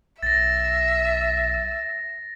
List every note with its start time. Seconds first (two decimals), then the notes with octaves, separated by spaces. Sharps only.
0.23 B1 E5 A6 A#6